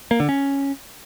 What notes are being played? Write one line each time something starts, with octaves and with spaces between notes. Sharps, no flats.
A#3
D3
C#4